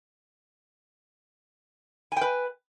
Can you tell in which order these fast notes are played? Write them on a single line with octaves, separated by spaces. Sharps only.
G#5 G5 B4